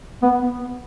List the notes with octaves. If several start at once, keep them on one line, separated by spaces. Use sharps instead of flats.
B3